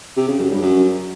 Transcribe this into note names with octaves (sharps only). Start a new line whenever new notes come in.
C3
C#3
F#2
G2
F#2